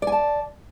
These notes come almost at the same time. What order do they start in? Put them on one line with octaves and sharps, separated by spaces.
D5 G#5 A5